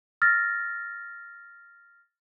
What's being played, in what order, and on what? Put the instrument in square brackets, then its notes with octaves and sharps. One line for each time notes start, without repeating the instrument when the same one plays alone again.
[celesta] E6 F6 A6 A#6